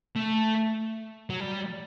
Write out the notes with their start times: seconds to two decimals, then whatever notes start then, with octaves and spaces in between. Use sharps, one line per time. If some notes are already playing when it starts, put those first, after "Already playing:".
0.16 A3
1.30 F#3
1.41 G3